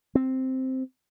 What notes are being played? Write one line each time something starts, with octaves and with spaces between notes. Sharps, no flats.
C4